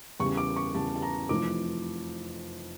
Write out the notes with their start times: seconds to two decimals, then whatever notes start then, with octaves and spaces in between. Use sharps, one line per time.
0.20 E2 C#3 G3 C#6
0.37 D6
0.56 C#6
0.74 E2 C#3 G3 A5
0.96 A5
1.02 A#5
1.29 F1 F2 E3 D6